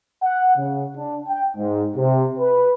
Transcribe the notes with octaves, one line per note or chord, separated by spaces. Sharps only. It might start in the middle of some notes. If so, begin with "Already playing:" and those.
F#5
C#3
D4
G5
G#2
C3
B4